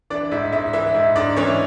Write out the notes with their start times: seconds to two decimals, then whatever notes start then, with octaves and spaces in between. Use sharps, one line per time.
0.10 E3 D4 D5
0.31 G#2 E4 E5
0.52 G#2 E4 E5
0.73 E3 E4 E5
0.94 G#2
1.16 G#2 D4 D5
1.36 E3 C#4 C#5